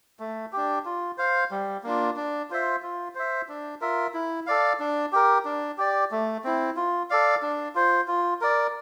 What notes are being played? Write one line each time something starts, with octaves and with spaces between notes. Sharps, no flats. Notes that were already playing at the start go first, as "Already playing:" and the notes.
A3
D4 G4
F4
C5 F5
G3
A#3 D4 F4
D4
F4 C5 E5
F4
C5 E5
D4
F4 A#4 E5
E4
A4 D5 F5
D4
G4 A#4
D4
G4 D5
A3
C4 E4
F4
A4 D5 F5
D4
F4 C5
F4
A#4 D5